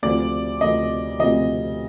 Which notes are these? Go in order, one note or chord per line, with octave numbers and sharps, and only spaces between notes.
D2 C3 F3 D5
D2 C3 F3 D#5
D2 C3 F3 D#5